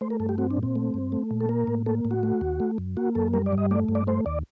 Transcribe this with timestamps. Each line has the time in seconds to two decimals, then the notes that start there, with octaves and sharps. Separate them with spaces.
0.01 A3 C5
0.10 A#4
0.20 G2 A4
0.29 G4
0.38 C4 F#4
0.51 D4
0.57 A#2
0.63 C4
0.76 A3
0.94 G2
1.12 A3
1.31 A#2
1.41 A4
1.49 A#3 A#4
1.67 A2
1.86 A#3 A4
2.05 A2
2.11 F#4
2.23 A3
2.41 D#2
2.60 A3
2.78 F#2
2.97 A#3 F#4
3.15 F#2 A4
3.33 G3 A#4
3.46 D5
3.52 G2
3.58 D#5
3.71 A3 D5
3.89 G2
3.95 D5
4.07 A3 C5
4.26 D#2 D5